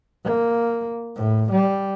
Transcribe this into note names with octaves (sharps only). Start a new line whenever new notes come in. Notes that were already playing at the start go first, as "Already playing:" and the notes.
A#3
A2
G3